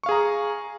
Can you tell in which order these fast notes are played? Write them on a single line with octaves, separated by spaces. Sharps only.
C#6 F5 G#4 A#5